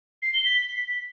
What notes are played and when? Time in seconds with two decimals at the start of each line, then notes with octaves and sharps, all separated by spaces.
0.22 C7
0.34 G7
0.45 B6